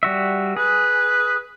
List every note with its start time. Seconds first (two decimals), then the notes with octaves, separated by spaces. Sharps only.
0.03 G3 F#4 E5
0.57 G#4 B4